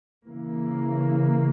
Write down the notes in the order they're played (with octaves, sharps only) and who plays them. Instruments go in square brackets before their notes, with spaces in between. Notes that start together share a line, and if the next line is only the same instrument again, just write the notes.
[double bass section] C#3 E3 A#3